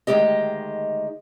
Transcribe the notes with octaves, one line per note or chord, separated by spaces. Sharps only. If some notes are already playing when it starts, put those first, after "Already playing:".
D2 D#3 F#3 G#3 G4 D#5